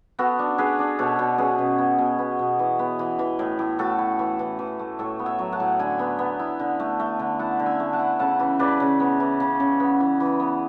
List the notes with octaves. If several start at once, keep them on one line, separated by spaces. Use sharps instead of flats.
B3 F#4 A4
D4
D4 G#4 B4
D4
B2 A4 C#5
B2
C#4 G#4 B4
B2
B3
B2
B3
B2
E3
B3
E3
E3
A2
A2
A2 F#4 A4
E4
E3
E3
E3
A3
A2 A4 C#5
B3
C#5 E5
F#3
F#5 A5
A2
D3 G#5 B5
B3
B3
E4
D3
A3
A3
D3
E4 F#5 A5
D3
E5 G#5
A3
F#5 A5
E4
C#3 F#5 A5
E3
C#3 B4 D5
C#3
B3
E3
C#3
C#3
B3
E3
E3
B3